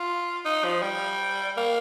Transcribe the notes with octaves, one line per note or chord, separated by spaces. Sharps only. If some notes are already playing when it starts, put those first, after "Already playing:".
Already playing: F4
D#4
F3
G3
A#3